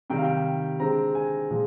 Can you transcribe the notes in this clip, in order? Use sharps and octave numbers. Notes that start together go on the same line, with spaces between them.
C3 D#3 G3 G5
F5
G5
D3 G#3 C4 A#5
G#5
A#2 F3 G#3